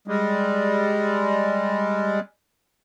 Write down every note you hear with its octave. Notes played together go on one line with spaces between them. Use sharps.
G3 G#3